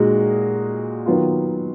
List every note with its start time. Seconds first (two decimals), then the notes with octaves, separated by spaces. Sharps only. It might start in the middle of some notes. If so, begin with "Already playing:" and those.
Already playing: A#2 G#3 D#4 F#4
1.06 D#3 F#3 B3 F4